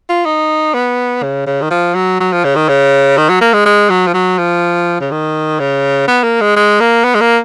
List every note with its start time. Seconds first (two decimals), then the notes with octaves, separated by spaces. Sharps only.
0.09 F4
0.25 D#4
0.74 B3
1.22 C#3
1.46 C#3
1.62 D#3
1.71 F3
1.95 F#3
2.20 F#3
2.32 F3
2.44 C#3
2.55 D#3
2.69 C#3
3.17 D#3
3.29 F#3
3.41 A#3
3.53 G#3
3.66 G#3
3.90 F#3
4.07 F3
4.14 F#3
4.38 F3
5.00 C#3
5.11 D#3
5.60 C#3
6.08 B3
6.24 A#3
6.41 G#3
6.56 G#3
6.81 A#3
7.04 B3
7.15 G#3
7.21 A#3